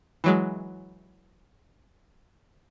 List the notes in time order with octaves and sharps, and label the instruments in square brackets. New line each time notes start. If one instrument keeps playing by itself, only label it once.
[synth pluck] E3 F#3 G#3